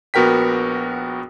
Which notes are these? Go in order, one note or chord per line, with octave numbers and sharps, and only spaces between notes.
A#1 B3 F#4 A#4 G5 B6